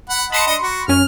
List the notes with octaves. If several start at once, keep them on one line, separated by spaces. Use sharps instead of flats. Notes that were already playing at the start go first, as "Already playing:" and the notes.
F#5 B5
D#5 F#5 A5 B5 C6 C#7
D4 D#5
F#4
F#2 C#4 F6